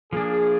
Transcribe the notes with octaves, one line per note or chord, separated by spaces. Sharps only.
F3 A#3 D4 G#4